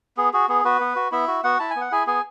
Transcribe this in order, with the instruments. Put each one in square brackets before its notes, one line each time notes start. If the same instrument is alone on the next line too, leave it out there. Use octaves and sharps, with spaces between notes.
[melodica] B3 G#4
F#4 G#4
B3 G#4
B3 F#4 B4
B3
F#4
B3 E4 E5
F#4
B3 F#4 F#5
E4 A5
G#5
B3
F#5
E4 G#4 G#5
B3 G#4 G#5